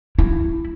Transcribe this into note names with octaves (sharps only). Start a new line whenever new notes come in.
E4